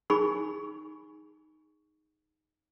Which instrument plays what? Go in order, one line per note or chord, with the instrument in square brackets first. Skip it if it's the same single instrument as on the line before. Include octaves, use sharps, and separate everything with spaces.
[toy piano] D#4 G#4 G#5 B5 C#6